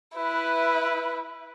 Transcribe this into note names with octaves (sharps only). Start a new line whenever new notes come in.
E4 B4